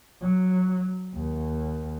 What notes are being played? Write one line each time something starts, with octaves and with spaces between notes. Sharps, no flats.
F#3
D#2